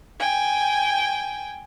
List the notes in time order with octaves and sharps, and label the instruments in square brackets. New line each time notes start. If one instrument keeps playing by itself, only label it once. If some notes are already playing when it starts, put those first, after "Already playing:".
[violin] G5 G#5